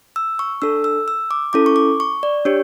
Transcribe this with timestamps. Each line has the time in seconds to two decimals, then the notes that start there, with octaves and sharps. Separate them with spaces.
0.16 E6
0.39 C#6
0.62 D4 A4 E6
0.84 E6
1.08 E6
1.31 D6
1.53 C#4 E4 A4 D6
1.66 C#6
1.76 D6
2.00 C#6
2.23 D5
2.45 D4 G4 C#5